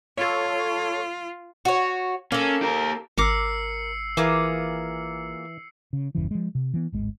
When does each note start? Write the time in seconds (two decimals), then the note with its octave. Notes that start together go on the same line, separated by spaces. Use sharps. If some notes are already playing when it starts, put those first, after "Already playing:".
0.18 F4 A4 C#5
1.65 F#4 C#5
2.32 A#3 C#4 A4
2.62 G4 A#4
3.18 G#1 A#4 D6 E6 C7 C#7
4.17 E3 A#3 F4 G#4
5.93 C#3
6.15 G1 E2 C#3 E3
6.31 F3 G#3
6.55 C3
6.74 E3 B3
6.92 D1 G#1 G#3